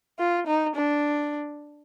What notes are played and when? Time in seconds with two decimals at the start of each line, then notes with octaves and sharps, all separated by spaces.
0.19 F4
0.47 D#4
0.76 D4